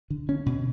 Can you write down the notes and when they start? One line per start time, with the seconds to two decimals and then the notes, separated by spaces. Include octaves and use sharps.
0.10 D3
0.29 C#4
0.46 B2